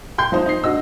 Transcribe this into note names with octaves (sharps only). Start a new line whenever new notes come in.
G5 C6 G6
F3 D#4 C5
D#4 C7
D3 F#4 D#5 E6